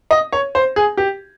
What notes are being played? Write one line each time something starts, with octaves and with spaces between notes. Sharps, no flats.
D#5
C#5
C5
G#4
G4